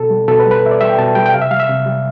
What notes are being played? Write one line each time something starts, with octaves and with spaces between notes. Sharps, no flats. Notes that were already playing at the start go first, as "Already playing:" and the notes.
Already playing: B2 A4
G3
B2 A4
B4
G3
B4
B2 E5
D5
G3 E5
G5
B2 A5
G3 G5
G5
C3 F5
E5
G3 F5
E5
C3
G3